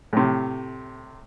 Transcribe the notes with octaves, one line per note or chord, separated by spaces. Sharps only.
A2 C3